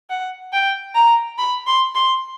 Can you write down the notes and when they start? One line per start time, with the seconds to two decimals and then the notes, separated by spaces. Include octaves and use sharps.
0.10 F#5
0.53 G5
0.95 A#5
1.38 B5
1.67 C6
1.95 C6